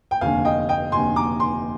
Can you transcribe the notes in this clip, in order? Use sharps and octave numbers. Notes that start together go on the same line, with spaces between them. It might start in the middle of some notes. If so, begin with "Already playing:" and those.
G5
F1 D#2 D3 F5 G#5
D#5 G5
D#5 G5
F1 D#2 D3 G#5 C6
A#5 D6
G#5 C6